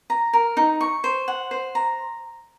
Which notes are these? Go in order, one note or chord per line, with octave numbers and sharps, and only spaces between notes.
A#5
A#4
D#4
C#6
C5
F#5
C5
A#5